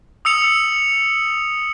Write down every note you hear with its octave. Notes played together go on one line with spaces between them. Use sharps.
D#6 E6 C#7 F7